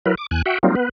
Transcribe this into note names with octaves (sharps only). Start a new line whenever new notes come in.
F#3 E4 A#4 B4
D6
E2 G#5 F#6
F#4 E5 F#5 G5
F#3 G3 A#3 C4 D#4 F4
B3 B4